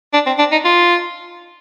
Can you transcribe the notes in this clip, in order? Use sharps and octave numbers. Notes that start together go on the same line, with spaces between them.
D4
C4
D4
D#4
F4